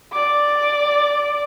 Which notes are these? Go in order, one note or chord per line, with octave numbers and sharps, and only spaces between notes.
D5 D6